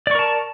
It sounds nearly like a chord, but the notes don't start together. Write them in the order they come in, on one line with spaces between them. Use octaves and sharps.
D5 C#6 A#4 A5